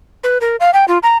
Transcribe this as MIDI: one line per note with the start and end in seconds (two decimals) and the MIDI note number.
0.24 0.38 71
0.41 0.56 70
0.60 0.71 77
0.74 0.85 79
0.88 0.98 65
1.03 1.17 82